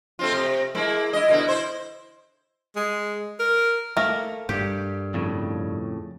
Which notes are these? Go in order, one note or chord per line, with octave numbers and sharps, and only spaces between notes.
A3 C4 F4
C3
G#3 A#3 E4
E4 D#5
B2 D3 E4
E4 C5
G#3
A#4
A3 A#3 A#4
G2 G4
F2 A2 C#3